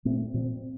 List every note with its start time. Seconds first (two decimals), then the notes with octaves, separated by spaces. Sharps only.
0.05 A#2 A3 C4
0.34 A#2 F3 C4